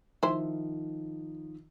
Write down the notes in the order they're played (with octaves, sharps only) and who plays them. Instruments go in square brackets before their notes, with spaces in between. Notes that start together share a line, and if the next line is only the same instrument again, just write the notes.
[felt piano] D#3 F3 [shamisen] E4 C5